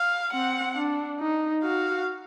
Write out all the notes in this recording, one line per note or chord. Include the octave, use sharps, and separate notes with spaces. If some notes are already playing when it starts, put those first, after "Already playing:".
Already playing: F5
C4 F#5
D4
D#4
F#4 F5